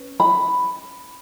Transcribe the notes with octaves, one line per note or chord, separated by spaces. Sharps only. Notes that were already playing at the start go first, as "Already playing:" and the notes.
Already playing: C#4 B4
B5